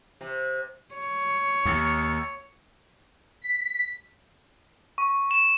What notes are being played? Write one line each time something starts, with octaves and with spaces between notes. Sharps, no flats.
C3
C#5
D#2
B6
C#6
E7